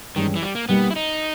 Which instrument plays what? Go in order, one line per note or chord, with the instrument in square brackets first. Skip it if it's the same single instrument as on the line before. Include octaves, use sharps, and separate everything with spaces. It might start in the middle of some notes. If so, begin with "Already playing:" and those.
[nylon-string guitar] G2 E3 G#3 C#4 [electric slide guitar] D#3
[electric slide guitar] E3
G3
A#3
[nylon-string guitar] B2 G3 A#3 D#4 [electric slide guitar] B3
[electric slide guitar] E4
D#4